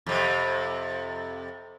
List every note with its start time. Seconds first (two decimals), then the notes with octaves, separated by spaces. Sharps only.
0.06 F2 C3